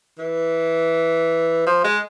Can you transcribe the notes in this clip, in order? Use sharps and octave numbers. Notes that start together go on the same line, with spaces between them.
E3
F3
G#3